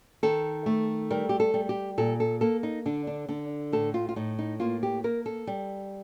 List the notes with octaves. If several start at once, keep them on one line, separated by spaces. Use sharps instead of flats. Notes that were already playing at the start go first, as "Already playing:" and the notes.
D#3 A4
A3
G3 A#4
G4
A4
G3
G4
A#2 A4
A4
A#3 A4
D#4
D3 D4
D4
D3 D4
A2 A4
F4
F4
A2 D#4
D#4
A#3 F4
G4
A#3 A#4
A4
G3